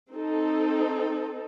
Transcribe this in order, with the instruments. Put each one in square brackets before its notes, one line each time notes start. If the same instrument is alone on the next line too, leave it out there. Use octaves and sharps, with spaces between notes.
[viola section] C4 D#4 A4